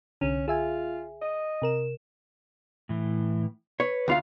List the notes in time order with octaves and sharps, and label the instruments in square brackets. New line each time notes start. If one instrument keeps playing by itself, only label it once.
[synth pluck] C2 D3 [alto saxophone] C#4
[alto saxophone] F4 [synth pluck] G#4 E5 G#5
[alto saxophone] D#5
[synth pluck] C3 A#4 E7
[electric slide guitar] A2 E3
[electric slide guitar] B4 [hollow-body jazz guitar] C#5
[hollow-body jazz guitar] D2 F4 F5